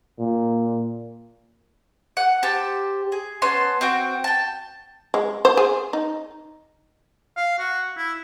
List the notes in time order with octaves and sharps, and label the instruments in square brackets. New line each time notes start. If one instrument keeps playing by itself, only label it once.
[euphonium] A#2
[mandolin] F#5
G4 C5 A5
G#4
B3 C#4 A5 C6
C4 F#4 G5
G5 A5
[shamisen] G#3
C5
G#4
D#4
[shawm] F5
F#4
E4